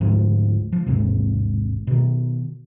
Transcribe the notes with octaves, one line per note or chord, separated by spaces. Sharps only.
D2 G#2 F3
F3
A1 D#2 G#2 C3
B2 D#3